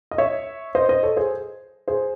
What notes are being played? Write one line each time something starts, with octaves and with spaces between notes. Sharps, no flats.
D#5
C#5 E5
C5 D#5
C5 D#5
A4 C#5
G#4 C5
G#4 C5